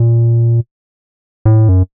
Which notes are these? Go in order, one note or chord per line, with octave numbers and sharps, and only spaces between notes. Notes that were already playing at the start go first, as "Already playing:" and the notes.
Already playing: A#2
A2
F#2